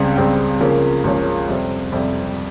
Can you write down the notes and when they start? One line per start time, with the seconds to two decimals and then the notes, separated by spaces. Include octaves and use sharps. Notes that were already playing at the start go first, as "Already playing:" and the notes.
Already playing: C#2 C#3 G3 C4
0.16 C#2 C#3 G3 C4
0.60 C#2 C#3 F3 A#3 C#4
1.04 C#2 C#3 F3 A#3 C#4
1.48 F2 C3 G3 C4
1.92 F2 C3 G3 C4